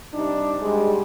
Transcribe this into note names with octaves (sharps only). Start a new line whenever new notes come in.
C3 G3 D4 D#4
G#2 G3 G#3